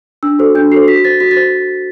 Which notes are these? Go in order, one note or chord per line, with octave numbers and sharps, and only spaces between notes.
D4 E6
F#4 A4 C5
D4 G6
F#4 A4 C5 C7
F#4 B6
C5 A6
F#4 B6
A6
C5